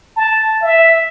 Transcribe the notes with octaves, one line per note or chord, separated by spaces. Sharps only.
A5
E5